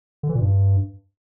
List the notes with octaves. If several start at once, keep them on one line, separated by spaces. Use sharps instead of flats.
D3
E3
A#2
G2